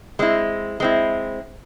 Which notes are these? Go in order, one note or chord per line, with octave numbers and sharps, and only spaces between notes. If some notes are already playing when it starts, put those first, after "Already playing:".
G#3 C4 E4
G#3 C4 E4